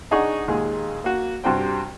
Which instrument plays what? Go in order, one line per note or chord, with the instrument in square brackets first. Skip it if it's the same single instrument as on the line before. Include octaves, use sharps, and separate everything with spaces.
[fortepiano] D4 D#4 G#4 F#5 C#6
D#2 A#2 G#3 G#4
A#3 F#4
G2 C3 F#4 C5 G5